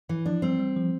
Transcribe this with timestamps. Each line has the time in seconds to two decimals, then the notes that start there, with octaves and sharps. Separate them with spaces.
0.09 E3 E4
0.26 F3 D4
0.42 G3 C4
0.59 G3
0.76 F3